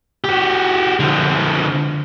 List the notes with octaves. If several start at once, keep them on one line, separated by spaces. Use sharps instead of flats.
F#4 G4
D3 F3